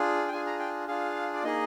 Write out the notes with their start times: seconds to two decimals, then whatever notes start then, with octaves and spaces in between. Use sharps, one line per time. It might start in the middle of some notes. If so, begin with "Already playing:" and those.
Already playing: D4 F4 G#4
0.28 G5
0.31 D4 F4 G#4 G#5
0.46 A#5
0.59 G5
0.87 D4 F4 G#4 F5
1.34 D5
1.43 A#3 D#4 G#4 D#5